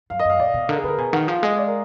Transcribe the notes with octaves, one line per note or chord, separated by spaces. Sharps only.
F#2 F5
D#5
F#2 F5
B2 D5
B2
D3 A#4
G#4
D3 A#4 B4
B2 G#5
D#3 F#5
F3 F5
G#3 D#5
D5
A#4